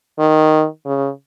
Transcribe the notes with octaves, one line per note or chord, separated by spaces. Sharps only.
D#3
C#3